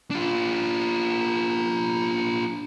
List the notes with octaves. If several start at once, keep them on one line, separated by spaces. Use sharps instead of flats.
D4 F4